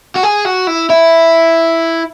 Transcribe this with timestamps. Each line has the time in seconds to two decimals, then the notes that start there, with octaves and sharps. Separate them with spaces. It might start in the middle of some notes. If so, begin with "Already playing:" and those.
0.16 F#4
0.23 G#4
0.45 F#4
0.67 E4
0.90 E4